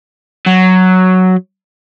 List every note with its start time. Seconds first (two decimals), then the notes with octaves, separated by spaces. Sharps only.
0.46 F#3